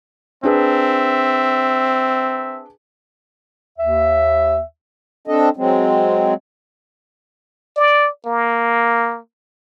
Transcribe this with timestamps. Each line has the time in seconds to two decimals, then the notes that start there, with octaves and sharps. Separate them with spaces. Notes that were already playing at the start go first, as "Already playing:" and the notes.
0.43 C4 D4 G#4 B4 E5
3.78 D#2 E5
5.27 C4 D4 A4 D#5
5.57 F#3 G#3 C4
7.76 D5
8.26 A#3